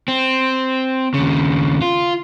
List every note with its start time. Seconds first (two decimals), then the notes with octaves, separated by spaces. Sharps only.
0.08 C4
1.14 D#2 C#3
1.82 F4